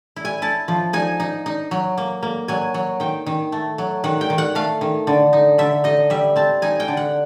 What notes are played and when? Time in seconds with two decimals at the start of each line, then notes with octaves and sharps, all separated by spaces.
0.16 E4
0.25 G#5
0.42 E4 A5
0.68 F3
0.93 D#4 G#5
1.20 D#4
1.46 D#4
1.71 F#3
1.97 A#3
2.23 A#3
2.48 F#3 G#5
2.74 F#3
3.00 D#3 G5
3.26 D#3
3.52 A3
3.78 F#3
4.04 D#3 F#5
4.21 G5
4.30 D#3
4.38 F#5
4.55 A3 F5
4.81 D#3
5.07 D3
5.33 D#4
5.58 D3 E5
5.84 D#4 D#5
6.10 G3 E5
6.36 C4 A5
6.62 D#4 G#5
6.80 G5
6.88 D3
6.97 F#5